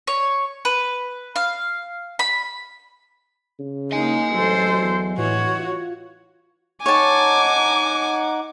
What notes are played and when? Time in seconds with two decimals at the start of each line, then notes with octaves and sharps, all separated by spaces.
0.07 C#5
0.65 B4
1.36 F5
2.19 B5
3.59 C#3
3.92 A#3 D#4 D#5 G#5
4.34 A1 F#3 A4 C5
4.82 E2
5.18 A2 E3 F#4 C#5
5.60 F4
6.86 D#4 C#5 F#5 G#5 A5 D6